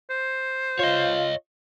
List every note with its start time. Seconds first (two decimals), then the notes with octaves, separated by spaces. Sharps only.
0.10 C5
0.79 F4 C#5 D#5